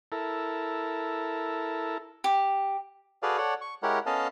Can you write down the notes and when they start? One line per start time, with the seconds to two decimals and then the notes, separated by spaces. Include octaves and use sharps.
0.12 E4 A4 A#4
2.24 G4
3.23 F#4 G#4 A4 B4 D5 F5
3.38 A4 C#5 D5 F#5
3.61 C#6
3.83 G#3 E4 G4 A#4 C#5 F#5
4.06 B3 C#4 A4 D#5 F5 A5